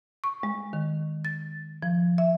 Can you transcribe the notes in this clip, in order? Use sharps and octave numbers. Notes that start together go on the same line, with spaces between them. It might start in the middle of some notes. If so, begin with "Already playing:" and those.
C#6
G#3
D#3
A6
F3
E5